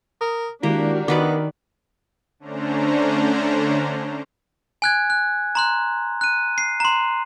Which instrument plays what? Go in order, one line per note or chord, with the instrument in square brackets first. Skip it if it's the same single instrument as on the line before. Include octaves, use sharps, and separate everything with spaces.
[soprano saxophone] A#4 [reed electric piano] D#6
[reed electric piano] D#3 G#3 E4 [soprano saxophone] A#3 [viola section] D4 F#4 A#4 [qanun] G4
[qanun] D#3 B4 D5 [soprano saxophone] B3 [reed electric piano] D6
[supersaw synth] D3 A3 C#4 D4 C5 A#5
[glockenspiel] G#5 F#6 G#6
F#6
A#5 C6 F#6
F#6 D#7
C7
A#5 C6